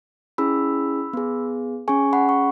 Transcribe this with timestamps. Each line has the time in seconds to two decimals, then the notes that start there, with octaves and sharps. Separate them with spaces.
0.38 C#4 E4 G#4 B5 E6
1.13 B3 G#4
1.88 C#4 G#4 G#5 C#6
2.13 F#5 B5
2.29 C#6